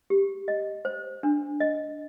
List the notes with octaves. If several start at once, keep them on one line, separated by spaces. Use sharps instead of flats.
G4
D#5
C5
D4
D#5